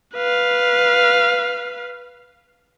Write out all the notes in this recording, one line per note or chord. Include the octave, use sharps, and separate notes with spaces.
B4 F5